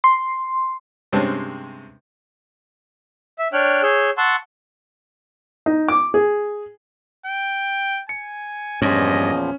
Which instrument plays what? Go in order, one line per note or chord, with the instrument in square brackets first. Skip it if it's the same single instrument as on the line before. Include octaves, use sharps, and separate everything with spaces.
[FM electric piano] C6
[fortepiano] G2 C3 G#3 C4 C#4 A5
[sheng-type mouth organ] E5
D4 C#5 G5 F6 F#6
G#4 C#5 E6 G6
F#5 A5 C6 C#6 E6
[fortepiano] D#4
D6
G#4
[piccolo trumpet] G5
[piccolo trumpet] G#5 [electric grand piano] C#7
[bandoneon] E2 A#2 F3 [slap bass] G2 [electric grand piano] C#4 [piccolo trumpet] D#5